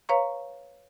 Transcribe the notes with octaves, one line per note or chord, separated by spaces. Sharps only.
B4 C#5 F5 A#5 C#6